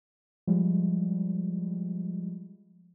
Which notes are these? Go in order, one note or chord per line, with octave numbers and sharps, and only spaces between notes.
F3 G3 G#3